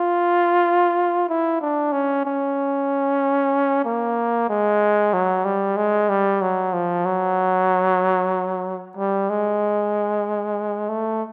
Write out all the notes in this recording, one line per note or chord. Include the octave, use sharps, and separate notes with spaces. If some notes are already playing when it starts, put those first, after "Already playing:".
Already playing: F4
E4
D4
C#4
C#4
A#3
G#3
F#3
G3
G#3
G3
F#3
F3
F#3
G3
G#3
A3